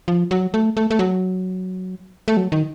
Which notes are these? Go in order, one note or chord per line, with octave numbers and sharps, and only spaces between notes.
F3
F#3
A3
A3
A3
F#3
A3
F#3
D#3